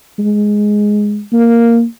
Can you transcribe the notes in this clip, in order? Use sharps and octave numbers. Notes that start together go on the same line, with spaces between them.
G#3
A#3